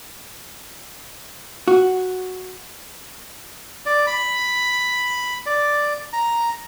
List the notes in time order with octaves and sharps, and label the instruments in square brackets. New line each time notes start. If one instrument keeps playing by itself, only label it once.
[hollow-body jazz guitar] F#4
[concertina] D5
B5
D5
A#5